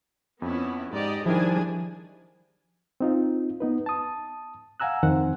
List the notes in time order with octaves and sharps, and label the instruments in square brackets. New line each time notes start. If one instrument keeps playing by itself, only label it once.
[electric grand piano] F2 [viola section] B3 C#4 E4
[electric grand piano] G#2 [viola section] G4 D5 D#5
[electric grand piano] D#3 G3 E4 [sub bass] F3 [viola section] D4 G#4 G#5
[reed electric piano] C4 D#4 F4
B3 D#4 B4
A5 D#6
F5 F#5 G#5 A#5 E6 F#6
F2 D#3 C4 C5 F#5